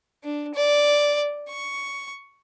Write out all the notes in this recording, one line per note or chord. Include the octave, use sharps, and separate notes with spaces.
D4
D5
C#6